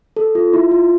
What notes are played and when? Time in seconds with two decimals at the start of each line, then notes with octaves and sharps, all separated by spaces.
0.17 A4
0.35 F4
0.53 E4
0.72 F4